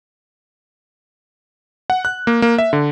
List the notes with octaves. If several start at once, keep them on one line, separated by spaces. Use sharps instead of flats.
F#5
F#6
A#3
A#3
E5
D3